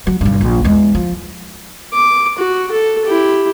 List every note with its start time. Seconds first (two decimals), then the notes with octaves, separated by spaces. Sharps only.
0.07 F#3
0.21 B1 G2
0.41 A#1
0.64 E2 G#3
0.95 F3
1.93 D6
2.38 F#4
2.71 A4
3.05 E4 G4